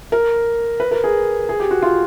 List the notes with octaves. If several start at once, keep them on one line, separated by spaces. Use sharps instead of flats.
A#4
B4
A#4
G#4
G#4
G4
F#4
F4